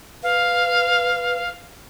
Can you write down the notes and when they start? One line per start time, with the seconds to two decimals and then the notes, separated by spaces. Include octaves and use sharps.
0.23 B4 F5